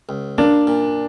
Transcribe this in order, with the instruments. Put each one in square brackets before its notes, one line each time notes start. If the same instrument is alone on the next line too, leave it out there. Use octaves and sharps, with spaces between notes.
[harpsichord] C#2
[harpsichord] A#3 [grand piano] D4
[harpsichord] A#2